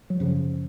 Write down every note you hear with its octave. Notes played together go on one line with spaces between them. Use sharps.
F#3
F#2 C#3 F3